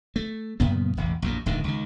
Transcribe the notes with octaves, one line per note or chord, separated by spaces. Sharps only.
A3
F#2 A#2 C#3 B3
E1 A1
A#1 F#2 A2
D1 D2 G#2 D#3
C#2 D#3